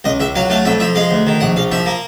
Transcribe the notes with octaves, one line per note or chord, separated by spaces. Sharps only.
C#2 D#5
C#2 E5
F#3 F5
A3 F5
F2 E5
F3 E5
G#3 F5
D2
D#3
A#1 F#5
A#1 F5
F3 E5
A#3